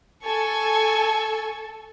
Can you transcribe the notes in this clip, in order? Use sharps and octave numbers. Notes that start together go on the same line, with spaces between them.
A4 G#5 C#6